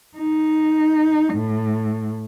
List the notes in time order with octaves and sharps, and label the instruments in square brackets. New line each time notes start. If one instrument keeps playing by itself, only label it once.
[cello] D#4
A2